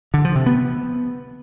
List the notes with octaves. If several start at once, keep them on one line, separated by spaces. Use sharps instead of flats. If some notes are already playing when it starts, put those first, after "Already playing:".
D3
F3
C3
B3